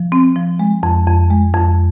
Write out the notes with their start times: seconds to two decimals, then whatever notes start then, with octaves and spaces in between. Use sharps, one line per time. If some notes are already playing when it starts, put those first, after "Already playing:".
Already playing: F3
0.12 C4
0.36 F3
0.59 G#3
0.83 F2
1.07 F2
1.30 G#3
1.54 F2